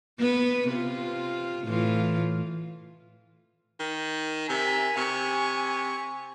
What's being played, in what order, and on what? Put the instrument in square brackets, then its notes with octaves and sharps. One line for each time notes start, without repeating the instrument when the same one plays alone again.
[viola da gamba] B3 B4
C3 F4
A2 E3 F4
[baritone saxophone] D#3
[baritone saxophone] C3 [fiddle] A#4 E5 [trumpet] G#5
[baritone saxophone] C3 [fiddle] C#6